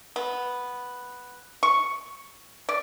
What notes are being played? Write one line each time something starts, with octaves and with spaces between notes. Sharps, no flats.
B3
C#6
D5